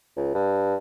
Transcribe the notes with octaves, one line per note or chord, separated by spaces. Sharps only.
C#2
G2